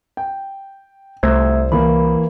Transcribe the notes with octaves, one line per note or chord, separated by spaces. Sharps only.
G5
C2 A3 C5 E6 G#6
E3 A#3 B5